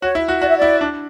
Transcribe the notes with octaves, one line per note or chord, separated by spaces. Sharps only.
F#4 C#5
E4
F#4
F#4 D5
E5
E4 D5
D4